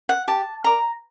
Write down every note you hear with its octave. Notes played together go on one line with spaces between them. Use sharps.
F#5
G4 A5
A#4 D5 A#5